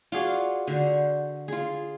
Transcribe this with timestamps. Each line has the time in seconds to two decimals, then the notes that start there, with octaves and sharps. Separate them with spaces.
0.12 F4 F#4 G#4 D5
0.67 D3 F#4 C5
1.48 F4 G#4